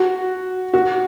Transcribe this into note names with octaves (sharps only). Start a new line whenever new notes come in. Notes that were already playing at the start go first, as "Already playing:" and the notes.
Already playing: F#4
F#4